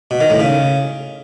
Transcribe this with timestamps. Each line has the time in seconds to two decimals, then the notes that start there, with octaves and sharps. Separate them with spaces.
0.11 B2
0.20 D#3
0.30 A2
0.40 C#3